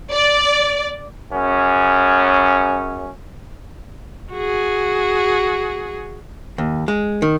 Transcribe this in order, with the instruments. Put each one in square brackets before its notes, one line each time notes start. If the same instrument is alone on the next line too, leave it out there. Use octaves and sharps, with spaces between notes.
[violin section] D5
[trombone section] F#2 C#3 C#4
[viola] F#4 G#4
[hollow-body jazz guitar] D#2
G#3
D#3